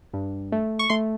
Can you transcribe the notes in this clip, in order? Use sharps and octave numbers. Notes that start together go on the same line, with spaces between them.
G2
A3
C#6
A3 C6